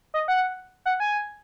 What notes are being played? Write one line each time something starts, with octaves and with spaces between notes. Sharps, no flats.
D#5
F#5
F#5
G#5